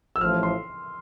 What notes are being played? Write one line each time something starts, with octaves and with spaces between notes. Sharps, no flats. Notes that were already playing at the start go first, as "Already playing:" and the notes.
E6
A1 A2 F3 F6
C6